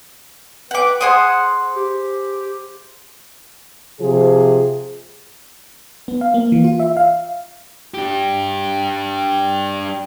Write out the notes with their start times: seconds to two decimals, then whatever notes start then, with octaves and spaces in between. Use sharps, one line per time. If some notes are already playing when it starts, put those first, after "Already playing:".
0.71 B4 F#5 D6
1.01 G#4 C5 F#5 D#6
1.76 G4
4.01 C3 F3 G#4
6.08 B3
6.21 F5
6.34 A#3
6.52 E3
6.64 F4
6.80 E5
6.97 F5
7.94 D4 G4